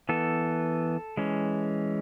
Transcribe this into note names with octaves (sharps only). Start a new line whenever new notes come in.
E3 B3 A4
E3 G#3 C#4